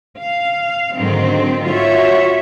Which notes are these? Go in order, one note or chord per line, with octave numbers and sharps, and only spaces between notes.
F5
G#2 D3 D#3 F#3 C4
F4 F#4 C#5 E5